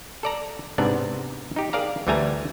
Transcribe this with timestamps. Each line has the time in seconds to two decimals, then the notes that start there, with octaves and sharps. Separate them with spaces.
0.23 A4 D5 A#5
0.78 G#2 C3 B3 D4 D5
1.56 D#4 G4
1.73 G#4 A#4 D5 F5 A#5
2.07 D2 E3 G3 A3 G#5 A#5